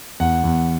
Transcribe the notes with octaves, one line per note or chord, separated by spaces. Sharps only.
E2 F#5
E2